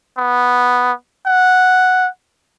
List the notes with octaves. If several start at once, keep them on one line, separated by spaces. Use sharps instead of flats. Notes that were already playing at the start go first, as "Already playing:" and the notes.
B3
F#5